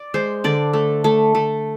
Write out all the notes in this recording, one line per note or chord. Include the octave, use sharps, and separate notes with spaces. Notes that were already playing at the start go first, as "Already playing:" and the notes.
Already playing: D5
G#3 C5
D3 D5
A3
A3
A3